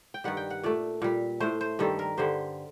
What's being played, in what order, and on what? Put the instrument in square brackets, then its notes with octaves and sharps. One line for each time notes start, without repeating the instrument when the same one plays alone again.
[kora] G5
G2 D#3 G3 F#5
G5
F#5
A#2 A3 D5
A#2 G3
A2 A3 C5
C5
G2 D#3 G3 A4
A#4
G2 D3 G3 C5